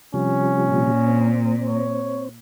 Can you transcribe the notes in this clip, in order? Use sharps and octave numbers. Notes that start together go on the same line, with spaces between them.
C3 F3 G3 C#4
A#2
C4
C#5